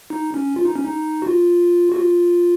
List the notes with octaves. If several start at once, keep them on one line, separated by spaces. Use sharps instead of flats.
D#4
C#4
F4
D#4
C#4
D#4
F#4
F4
F#4
F4